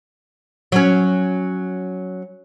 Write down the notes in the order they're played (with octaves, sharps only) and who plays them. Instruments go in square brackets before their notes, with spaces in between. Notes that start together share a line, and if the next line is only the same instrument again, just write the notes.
[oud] F#3 C#4